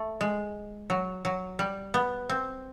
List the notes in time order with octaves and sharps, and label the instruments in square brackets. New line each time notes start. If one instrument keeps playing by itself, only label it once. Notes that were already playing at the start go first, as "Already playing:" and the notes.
Already playing: [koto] A3
G#3
F#3
F#3
G3
B3
C4